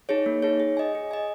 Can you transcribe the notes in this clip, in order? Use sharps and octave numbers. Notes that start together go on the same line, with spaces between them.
D#4 G#4 C#5
A#3
D#4 G#4 C#5
G#4
D#5 G#5
G#4
D#5 G#5